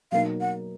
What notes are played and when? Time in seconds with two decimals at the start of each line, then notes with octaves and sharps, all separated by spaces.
0.12 B2 F#3 A#3 D#4 F5
0.41 F#5